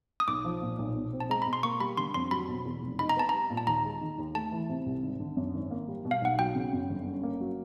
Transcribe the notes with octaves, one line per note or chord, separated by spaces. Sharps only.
D#6
B1 D6
F3
A#2
B1
B2
C4
A5
G#3 A#5
B2 B5
C6
A#3 C#6
G3 B5
D3 C6
F2 C6
F#3 B5
B2
E2
F1
D#4 B5
A#5
B3 A5
G3 A#5
A#2
A5
D#2 A#5
G#3
D#3
D#2
A3 A5
E3
C3
C2
G#1
D3
F#2
G#1
A#3
G3
B2
F5
B1 F#5
F#3 G5
C#3
F#2
G1
C#4
A#3
F#3